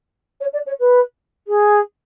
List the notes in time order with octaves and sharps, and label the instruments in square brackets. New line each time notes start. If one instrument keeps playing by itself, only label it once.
[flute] C#5
D5
C#5
B4
G#4